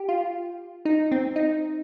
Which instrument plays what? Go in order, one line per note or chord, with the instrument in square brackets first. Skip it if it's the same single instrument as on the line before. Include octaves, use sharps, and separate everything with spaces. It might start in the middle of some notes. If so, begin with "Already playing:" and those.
Already playing: [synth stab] G4
F4
D#4
C4
D#4